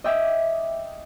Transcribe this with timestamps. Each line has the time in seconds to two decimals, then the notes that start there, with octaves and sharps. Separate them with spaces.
0.04 D#5 E5 G5 D6 E6 G#6